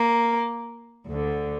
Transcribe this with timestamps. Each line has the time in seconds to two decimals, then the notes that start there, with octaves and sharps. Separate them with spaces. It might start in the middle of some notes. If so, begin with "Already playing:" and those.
Already playing: A#3
1.07 D2 D3